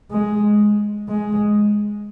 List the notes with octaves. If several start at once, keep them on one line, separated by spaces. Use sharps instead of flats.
G#3
G#3